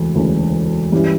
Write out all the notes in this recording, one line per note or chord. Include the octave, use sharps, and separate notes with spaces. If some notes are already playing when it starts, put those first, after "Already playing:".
Already playing: E1 D2 C#3 E3
E1 D2 C#3 E3
G2 E3 G3 C#4 E4